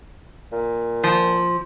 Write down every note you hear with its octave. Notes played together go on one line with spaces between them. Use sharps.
A#2
F3